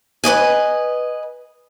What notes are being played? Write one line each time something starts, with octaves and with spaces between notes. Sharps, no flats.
B4 D5 D#5 G#5